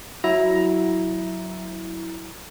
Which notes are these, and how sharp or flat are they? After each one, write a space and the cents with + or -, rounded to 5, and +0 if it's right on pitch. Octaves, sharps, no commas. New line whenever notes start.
F#3 +0 E4 -5 A#5 +10